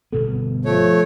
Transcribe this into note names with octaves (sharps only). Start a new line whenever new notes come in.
G1 B2 B3 A4
F3 A3 C#5